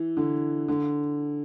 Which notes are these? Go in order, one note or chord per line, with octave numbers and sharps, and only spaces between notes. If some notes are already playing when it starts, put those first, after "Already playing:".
Already playing: E3
D3
D3